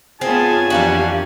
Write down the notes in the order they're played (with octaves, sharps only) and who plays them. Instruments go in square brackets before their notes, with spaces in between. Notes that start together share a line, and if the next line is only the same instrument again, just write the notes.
[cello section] B3 F4 C#5 [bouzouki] C4 [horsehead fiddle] G#4 A5 [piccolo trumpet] G#5
[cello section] F2 E3 [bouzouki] G3 A#3 F#4 [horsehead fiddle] D4 G4